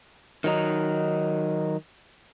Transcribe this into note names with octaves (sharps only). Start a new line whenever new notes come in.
D#3 F#3 D#4